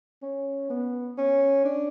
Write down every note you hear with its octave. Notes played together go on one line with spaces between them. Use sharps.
C#4
B3
C#4
D4